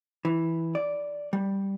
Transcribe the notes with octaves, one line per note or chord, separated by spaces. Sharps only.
E3
D5
G3